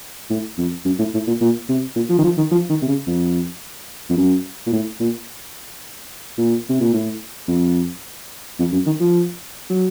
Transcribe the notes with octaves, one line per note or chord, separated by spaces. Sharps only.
A2
F2
F#2
A2
A2
A#2
A#2
C3
A#2
F3
D#3
F3
D#3
F3
D#3
C3
C#3
F2
F2
F#2
A#2
A2
A#2
A#2
C3
A#2
A2
F2
F2
F#2
D#3
F3
F#3